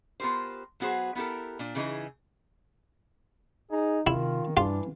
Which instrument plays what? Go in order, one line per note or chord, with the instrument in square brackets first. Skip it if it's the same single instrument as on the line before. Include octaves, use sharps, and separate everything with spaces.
[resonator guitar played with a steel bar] B3 F4 G4 A#4 C5
F#3 B3 F#4 G#4 C5
B3 E4 G4 A4 A#4
A#2 D4
C#3 E3 A3 C#4 D#4 G#4
[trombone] D#4 [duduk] G#4
[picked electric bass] C3 [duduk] D#3 [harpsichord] E4 [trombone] F4
[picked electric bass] G2 [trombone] E3 [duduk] D4 [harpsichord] F4